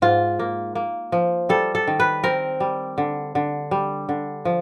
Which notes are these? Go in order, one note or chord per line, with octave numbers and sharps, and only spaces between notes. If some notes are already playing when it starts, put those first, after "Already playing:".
G#2 F4
A#3
A#3
F3
G3 A4
A4
D#3
B4
C4 A#4
G3
D3
D3
G3
D3
F3